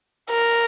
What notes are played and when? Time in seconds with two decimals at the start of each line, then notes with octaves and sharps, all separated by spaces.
0.30 A#4